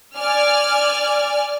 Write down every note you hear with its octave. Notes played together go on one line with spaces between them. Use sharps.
D5 G#5 F6